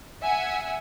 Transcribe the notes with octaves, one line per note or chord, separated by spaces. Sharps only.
E5 F#5 G#5